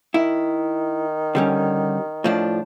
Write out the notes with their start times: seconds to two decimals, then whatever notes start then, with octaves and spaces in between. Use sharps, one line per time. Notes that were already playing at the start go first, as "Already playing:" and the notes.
0.14 D#3 E4
1.35 D3 G3 C#4
2.24 A2 F3 D4